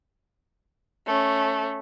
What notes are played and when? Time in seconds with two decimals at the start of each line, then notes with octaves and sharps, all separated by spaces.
1.07 A3 C#4